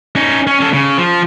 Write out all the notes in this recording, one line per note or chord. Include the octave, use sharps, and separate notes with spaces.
C#4 D#4
C#4
C#4 A4
C#3
F3